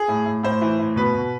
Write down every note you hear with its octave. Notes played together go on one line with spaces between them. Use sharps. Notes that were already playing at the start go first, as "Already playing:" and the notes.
Already playing: G#4
A2
A2
A2 C5
E3
A2
B2 B4
B2